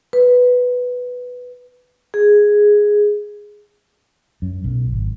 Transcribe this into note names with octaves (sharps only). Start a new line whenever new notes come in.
B4
G#4
F#2
B1
G#1